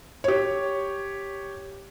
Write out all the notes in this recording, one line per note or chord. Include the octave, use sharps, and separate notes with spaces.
G4 C#5